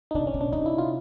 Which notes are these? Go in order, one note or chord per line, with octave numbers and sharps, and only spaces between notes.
D#4
C3 D4
C#4
B2
D4
C3 D#4
E4
F4